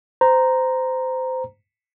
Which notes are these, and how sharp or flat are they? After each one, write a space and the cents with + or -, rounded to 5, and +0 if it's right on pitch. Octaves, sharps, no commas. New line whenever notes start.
C5 -20 A#5 +0